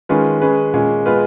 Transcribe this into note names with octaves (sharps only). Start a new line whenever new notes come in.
D#3 G#3 C#4 F4 B4
G#3 C#4 G#4 B4
A#2 G#3 C#4
G#3 B3 F4 B4